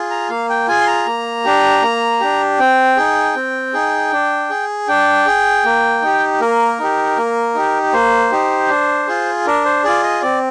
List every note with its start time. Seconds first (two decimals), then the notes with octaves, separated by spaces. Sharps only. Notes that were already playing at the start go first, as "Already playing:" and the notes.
Already playing: F4 G#4
0.10 A#5
0.29 A#3 F5
0.50 G5
0.68 F4 G#4 G#5
0.81 C6
0.87 A#5
1.07 A#3
1.45 D4 G4
1.83 A#3
2.20 D4 G4
2.59 C4 G5
2.97 D#4 G#4
3.36 C4
3.74 D#4 G#4
4.12 D4
4.50 G#4
4.88 D4 G5
5.26 G#4
5.65 A#3
6.02 D#4 G4
6.40 A#3 A#4
6.79 D#4 G4
7.18 A#3
7.55 D#4 G4
7.93 A#3 C5
8.32 D#4 G4
8.69 D4
9.07 F4 G#4
9.46 D4 A#4
9.65 C5
9.84 F4 G#4 D5
10.03 D#5
10.22 C4 D5